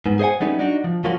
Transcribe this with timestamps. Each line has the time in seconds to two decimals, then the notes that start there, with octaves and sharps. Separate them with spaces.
0.06 G#2 B3
0.19 G#4 C5 D#5 F#5 G#5
0.40 F#3 G3 A3 B3 C#4 D#4
0.59 D4 D#4 F#4
0.84 F3
1.04 F3 F#3 A#3 C#4 F4 F#4